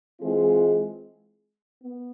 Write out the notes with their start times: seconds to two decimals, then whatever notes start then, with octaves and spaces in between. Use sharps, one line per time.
0.20 E3 G#3 C4 F4 G#4
1.83 B3